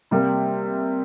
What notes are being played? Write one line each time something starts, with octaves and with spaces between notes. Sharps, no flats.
C3 G3 A#3